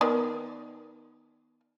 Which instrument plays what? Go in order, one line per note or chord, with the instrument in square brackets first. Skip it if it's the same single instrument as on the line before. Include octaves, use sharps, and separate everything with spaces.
[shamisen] D#3 B3 D5